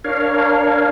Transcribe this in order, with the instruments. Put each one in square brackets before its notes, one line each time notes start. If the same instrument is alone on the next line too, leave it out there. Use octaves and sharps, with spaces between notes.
[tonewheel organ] D4 A#4 C#5 F5